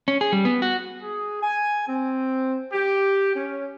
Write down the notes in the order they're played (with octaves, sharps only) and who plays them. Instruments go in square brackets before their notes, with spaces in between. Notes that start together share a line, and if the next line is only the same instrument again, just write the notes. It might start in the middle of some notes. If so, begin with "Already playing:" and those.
[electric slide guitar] C#4
G#4
G3
B3
F#4
[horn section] G#4
G#5
C4
G4
C#4